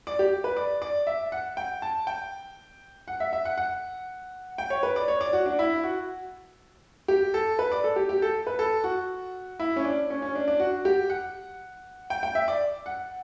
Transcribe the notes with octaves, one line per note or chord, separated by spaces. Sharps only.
D5
G4
B4
D5
D5
E5
F#5
G5
A5
G5
F#5
E5
E5
F#5
F#5
G5
C#5
B4
D5
C#5
D5
F#4
D4
E4
F#4
G4
A4
B4
D5
A4
G4
G4
A4
B4
A4
F#4
E4
C#4
D4
C#4
C#4
D4
D4
F#4
G4
F#5
G5
G5
E5
D5
F#5